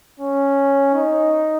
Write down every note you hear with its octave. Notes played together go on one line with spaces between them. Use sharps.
C#4
D#4